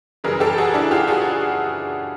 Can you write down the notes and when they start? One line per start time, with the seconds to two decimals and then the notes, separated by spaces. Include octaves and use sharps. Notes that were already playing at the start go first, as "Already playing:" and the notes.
0.24 F#2 C#3 E3 G3 G#4 A#4
0.40 G4 A4
0.58 F#4 G#4
0.74 D4 E4
0.91 F4 G4
1.08 F#4 G#4